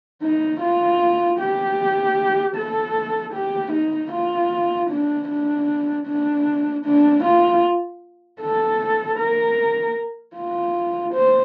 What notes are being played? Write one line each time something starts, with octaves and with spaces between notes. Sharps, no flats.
D#4
F4
G4
A4
G4
D#4
F4
D4
D4
D4
D4
F4
A4
A#4
F4
C5